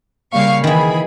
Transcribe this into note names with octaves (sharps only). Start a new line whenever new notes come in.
C#3 G3 A#3 F5 C#6
D#3 E3 E4 G#4 B5